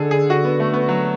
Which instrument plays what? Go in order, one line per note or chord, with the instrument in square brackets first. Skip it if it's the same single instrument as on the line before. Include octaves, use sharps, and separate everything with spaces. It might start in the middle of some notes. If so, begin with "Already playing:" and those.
Already playing: [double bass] D3 [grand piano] G#4 A4
[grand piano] G#4
F#4
B3
A3
B3
F#3